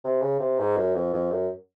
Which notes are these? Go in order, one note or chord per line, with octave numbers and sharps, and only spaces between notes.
C3
C#3
C3
G#2
F#2
F2
F2
F#2